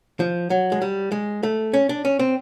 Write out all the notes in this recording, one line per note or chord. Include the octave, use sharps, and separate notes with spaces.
F3
F#3
G#3
G3
G#3
A3
C#4
D4
C#4
C4